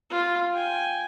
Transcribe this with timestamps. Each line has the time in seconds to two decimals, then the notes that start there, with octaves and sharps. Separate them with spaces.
0.10 F4
0.54 G5 G#5